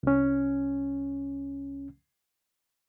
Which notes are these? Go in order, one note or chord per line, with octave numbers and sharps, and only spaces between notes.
C2 C#4